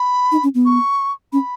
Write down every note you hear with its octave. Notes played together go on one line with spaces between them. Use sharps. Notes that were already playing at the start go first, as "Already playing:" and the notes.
Already playing: B5
D#4
C#4
B3
C#6
C#4 B5